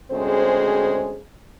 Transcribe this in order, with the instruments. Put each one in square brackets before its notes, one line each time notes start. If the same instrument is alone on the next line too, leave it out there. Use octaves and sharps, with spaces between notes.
[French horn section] D2 G#3 C4 C#4 G#4 C5